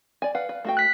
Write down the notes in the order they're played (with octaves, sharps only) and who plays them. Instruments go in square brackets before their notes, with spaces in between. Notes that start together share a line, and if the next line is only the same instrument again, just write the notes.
[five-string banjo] D5 G#5
[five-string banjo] B4 F#5 [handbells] F5
[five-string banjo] B4
A3 F#4 G5
[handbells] F#6 B6